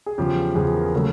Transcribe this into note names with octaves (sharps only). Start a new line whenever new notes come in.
G#4
E2 C#3 F3 G4
E2 C#3 F3 G#4
A#4
C#3 F#3 A3